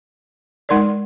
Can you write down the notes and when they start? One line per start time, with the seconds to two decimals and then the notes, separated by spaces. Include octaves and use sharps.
0.69 G#3 D#4 A#4 D5